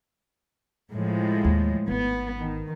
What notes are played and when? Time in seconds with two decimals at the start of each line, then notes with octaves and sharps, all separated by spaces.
0.91 A2 F3 G#3
1.44 D#2
1.88 G#1 B3
2.38 D#3